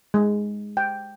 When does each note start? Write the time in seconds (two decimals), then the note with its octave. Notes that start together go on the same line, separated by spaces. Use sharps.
0.14 G#3
0.77 G5